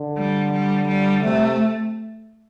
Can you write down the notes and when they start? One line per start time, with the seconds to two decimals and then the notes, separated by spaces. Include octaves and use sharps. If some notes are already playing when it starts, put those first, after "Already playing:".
Already playing: D3
0.17 G3
0.53 G3
0.88 G3
1.23 C3 A3